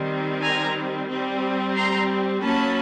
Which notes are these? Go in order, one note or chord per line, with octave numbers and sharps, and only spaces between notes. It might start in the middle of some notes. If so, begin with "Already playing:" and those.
Already playing: D#3 G3 C4
G#5 A#5
G3 C4
A#5 C6
F#3 A#3 C#4 A5 B5